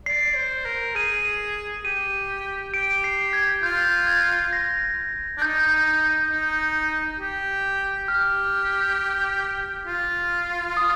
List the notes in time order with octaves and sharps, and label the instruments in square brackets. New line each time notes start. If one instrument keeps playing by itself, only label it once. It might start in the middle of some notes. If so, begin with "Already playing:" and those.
[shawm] D5 [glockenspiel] C7
[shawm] C5
A#4
[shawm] G#4 [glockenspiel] D#7
[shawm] G4 [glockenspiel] D#7
[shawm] G4 [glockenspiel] D7
[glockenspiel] C7
G#6
[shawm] F4 [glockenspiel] G6
[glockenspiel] G#6
A#6
[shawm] D4
[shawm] D#4 [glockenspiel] G6
[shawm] D#4
G4
[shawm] G4 [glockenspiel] F6
[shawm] F4
[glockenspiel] D#6